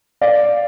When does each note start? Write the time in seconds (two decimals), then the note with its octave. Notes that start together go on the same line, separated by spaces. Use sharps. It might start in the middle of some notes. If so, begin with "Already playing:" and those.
0.21 D5 F5